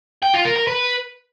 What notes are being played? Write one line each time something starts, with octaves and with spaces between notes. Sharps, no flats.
G5
F4
A#4
A#4
B4